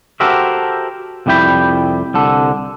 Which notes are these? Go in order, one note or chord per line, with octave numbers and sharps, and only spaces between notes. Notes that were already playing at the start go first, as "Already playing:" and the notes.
F#4 G4 A4 A#4 C5 E5
C2 F2 G3 E4 G5 B5
C2 D3 A4